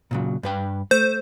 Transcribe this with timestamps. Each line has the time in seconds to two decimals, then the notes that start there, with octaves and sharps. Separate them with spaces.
0.11 A#2 C#3 F#3
0.43 G2 B4 G5
0.91 A3 C5